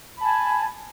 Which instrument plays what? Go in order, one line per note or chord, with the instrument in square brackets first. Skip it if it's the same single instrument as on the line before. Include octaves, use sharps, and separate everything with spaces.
[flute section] B5
A5
G#5